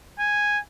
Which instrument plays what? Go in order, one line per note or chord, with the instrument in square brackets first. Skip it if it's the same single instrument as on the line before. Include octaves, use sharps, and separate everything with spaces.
[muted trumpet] G#5